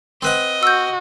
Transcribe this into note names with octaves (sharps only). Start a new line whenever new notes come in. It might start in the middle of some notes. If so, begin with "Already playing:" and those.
C4 B4 D#5 F#5
F#4 E6 G6